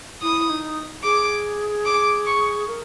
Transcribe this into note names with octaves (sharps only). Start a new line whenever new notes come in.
E4 D#6
D#4
G#4 D6
D6
C#6
A#4